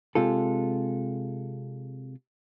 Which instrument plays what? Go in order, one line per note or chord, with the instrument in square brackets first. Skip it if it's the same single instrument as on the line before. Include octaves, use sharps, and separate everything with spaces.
[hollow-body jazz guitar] C3 G#3 F4 A4